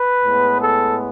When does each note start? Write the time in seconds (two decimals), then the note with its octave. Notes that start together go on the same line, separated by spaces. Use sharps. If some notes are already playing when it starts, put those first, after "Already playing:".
Already playing: B4
0.25 A2 G#3 B3
0.60 A4